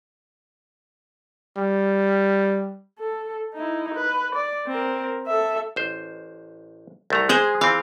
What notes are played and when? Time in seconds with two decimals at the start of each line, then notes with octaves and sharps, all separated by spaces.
1.57 G3
2.99 A4
3.54 D#4 E4
3.95 B4
4.35 D5
4.67 C4 A#4
5.27 A4 E5
5.76 A1 C5
7.10 C2 A3 A#5
7.29 G#3 G#4 C5
7.61 E3 C4 F5